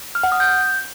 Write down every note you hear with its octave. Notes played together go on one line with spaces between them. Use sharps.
F6
F#5
D#6
G6